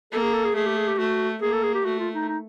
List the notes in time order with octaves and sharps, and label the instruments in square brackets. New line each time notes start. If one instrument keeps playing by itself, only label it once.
[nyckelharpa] A#3 [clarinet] A4
[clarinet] G#4
A4
G#4
[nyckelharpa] A3 [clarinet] G#4
[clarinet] G4
G#4
G4
[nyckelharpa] A3 [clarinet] F#4
[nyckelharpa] A#3 [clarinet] G#4
[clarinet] A4
G#4
G4
[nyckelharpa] A3 [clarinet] F#4
[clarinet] F4
D#4
D#4